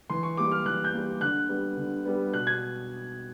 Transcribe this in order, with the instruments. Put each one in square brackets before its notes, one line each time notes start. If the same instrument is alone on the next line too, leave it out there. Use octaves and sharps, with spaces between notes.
[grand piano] E3 C6
C#6
G3 A#3 D6
F6
E3 F#6
G6
G3 A#3
D3 F#6
G3 B3
D3
G3 B3
B2 F#6
G#6